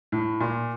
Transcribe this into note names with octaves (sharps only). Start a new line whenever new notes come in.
A2
A#2